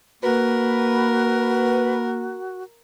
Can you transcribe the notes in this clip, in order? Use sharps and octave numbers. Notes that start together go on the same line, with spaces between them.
A#3 F#4 A#4 B4